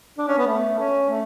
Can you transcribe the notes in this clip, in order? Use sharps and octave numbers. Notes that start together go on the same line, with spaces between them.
D4
C#4
B3
A3
C#4
A3